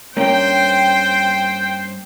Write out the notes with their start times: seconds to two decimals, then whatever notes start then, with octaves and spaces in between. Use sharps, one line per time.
0.17 G2 A#3 C#4 C5 G5